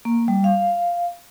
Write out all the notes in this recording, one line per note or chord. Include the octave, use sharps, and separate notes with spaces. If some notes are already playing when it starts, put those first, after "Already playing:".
A#3
G3
F5